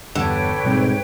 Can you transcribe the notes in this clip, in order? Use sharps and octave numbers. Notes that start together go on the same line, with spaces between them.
E2 G2 D3 B4 C#5 G5
G#2 B2 G3 C4